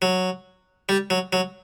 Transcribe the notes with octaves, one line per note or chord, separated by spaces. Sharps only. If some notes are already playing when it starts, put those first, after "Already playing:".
F#3
G3
F#3
F#3